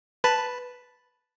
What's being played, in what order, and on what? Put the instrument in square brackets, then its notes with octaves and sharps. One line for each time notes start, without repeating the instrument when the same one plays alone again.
[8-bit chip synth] B4 A5 B5